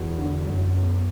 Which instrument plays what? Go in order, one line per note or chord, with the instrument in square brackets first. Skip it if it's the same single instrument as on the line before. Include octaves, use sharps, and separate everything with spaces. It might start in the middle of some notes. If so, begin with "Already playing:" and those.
Already playing: [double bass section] E2 [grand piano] F#4
[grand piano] D3
[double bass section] F#2 [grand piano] F#3
[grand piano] B3